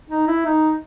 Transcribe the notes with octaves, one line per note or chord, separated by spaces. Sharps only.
D#4
E4
D#4